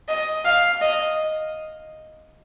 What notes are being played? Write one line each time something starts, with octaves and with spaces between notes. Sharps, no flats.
D#5
F5
D#5